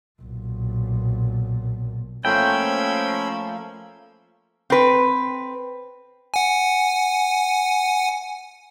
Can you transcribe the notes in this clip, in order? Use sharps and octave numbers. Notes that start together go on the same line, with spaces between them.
B1 A#2
F3 A3 A#3 C#4 C5 G5 B5 E6
C4 B4
F#5 G#5